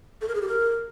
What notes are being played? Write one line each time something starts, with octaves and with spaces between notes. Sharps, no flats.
A4
A#4
G#4
G4
A#4